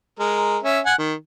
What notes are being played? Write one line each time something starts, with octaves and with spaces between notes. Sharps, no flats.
G#3 A#4
C#4 E5
F#5 G#5
D#3